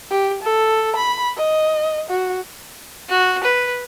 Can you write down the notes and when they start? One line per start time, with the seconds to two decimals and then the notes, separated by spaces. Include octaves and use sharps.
0.11 G4
0.43 A4
0.96 B5
1.37 D#5
2.10 F#4
3.09 F#4
3.43 B4